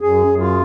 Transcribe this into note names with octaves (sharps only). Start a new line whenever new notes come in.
F#2 G#4
F#2
F4